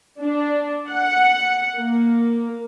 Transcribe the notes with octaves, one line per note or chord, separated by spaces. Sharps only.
D4
F#5
A#3